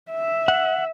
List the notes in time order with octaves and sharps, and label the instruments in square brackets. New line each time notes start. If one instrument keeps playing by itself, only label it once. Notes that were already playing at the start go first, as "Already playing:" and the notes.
[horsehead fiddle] E5
[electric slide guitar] F#5